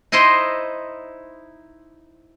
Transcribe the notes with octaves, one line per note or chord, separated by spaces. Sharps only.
D#4 E4 C5 D#5 C6